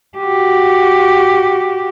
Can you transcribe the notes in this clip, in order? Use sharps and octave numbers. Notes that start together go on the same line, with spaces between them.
F#4 G4